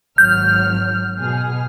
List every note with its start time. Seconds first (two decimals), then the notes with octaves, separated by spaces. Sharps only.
0.18 G#1 F#3 F6 G6
1.20 B2 G#4 F6